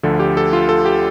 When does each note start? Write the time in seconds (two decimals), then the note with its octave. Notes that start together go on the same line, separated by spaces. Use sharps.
0.03 D2 D3 F3 A4
0.20 G4
0.37 A4
0.53 F4
0.69 A4
0.86 G4